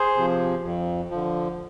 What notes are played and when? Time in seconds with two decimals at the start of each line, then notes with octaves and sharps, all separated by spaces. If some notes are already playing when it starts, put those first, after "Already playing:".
Already playing: G#4 C5
0.17 C3 F3
0.64 F2
1.10 D3 F3